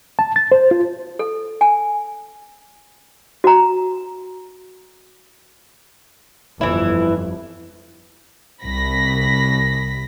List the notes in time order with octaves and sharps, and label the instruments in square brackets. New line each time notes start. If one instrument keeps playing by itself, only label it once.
[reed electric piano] A5
A6
C5
F4
[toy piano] A4
G#5
F#4 A#5
[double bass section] G1 F2 [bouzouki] E3 E4
[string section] C2 B5 A#6 B6